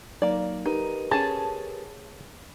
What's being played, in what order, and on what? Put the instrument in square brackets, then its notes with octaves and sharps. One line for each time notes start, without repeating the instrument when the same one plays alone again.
[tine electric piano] F#3 D#4 [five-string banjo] A#3 D5
[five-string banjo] D#4 [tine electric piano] G4 A#4 B4
[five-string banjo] C#4 G#4 [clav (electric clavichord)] A5